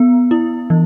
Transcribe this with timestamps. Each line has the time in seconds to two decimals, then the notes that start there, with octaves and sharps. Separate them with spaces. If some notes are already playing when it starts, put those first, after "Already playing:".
Already playing: B3
0.31 E4
0.70 E3